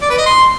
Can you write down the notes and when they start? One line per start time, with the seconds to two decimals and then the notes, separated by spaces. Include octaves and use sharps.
0.02 D5
0.10 B4
0.18 D#5
0.26 C6